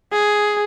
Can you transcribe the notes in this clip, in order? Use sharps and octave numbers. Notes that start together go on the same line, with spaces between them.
G#4